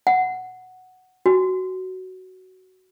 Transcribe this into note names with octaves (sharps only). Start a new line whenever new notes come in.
F#5
F#4